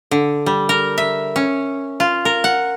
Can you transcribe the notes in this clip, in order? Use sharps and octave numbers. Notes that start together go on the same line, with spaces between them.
D3
G3
A#4
E5
C#4
F4
A#4
F#5